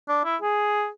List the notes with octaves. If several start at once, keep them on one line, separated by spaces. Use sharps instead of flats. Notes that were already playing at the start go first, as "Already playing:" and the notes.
D4
E4
G#4